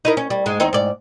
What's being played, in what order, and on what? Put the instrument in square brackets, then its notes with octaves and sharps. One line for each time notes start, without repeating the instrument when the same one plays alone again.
[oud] D#4 E4 A#4
C#4
G3
G#2 G#3
E2 C4 D#4
G#2 D5